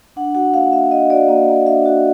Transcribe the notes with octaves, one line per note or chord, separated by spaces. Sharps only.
D4 F#5
F#4 F#5
A#3 F5
A#3 E5
D4 D#5
F#4 D5
A#3 D#5
A#3
D4 E5
F#4